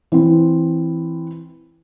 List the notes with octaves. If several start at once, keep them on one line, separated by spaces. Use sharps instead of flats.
E3 C4